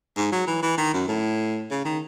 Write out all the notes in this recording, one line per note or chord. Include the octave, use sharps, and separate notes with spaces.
G#2
F#3
E3
E3
D#3
F#2
A2
C#3
D#3